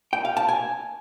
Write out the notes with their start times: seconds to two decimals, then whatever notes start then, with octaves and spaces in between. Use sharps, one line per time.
0.13 G5
0.25 F5
0.37 A5
0.49 G#5